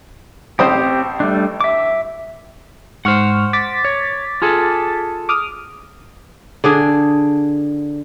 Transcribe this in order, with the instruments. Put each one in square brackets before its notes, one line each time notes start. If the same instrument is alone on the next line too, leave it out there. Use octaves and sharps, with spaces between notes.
[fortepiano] A1 C5 D#6 [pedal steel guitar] C4 G4
[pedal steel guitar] G3 A3 D4
E5 D6
[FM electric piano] G#2 C#6 F6 [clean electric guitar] C5 F#5
[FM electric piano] D6 A6 B6
[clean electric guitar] C#5
F4 G#4 A4
[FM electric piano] D6 D#6 F6
[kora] D3 D4 G#4